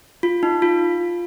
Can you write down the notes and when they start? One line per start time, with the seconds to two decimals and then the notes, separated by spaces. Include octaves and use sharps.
0.23 F4
0.43 D#4
0.62 F4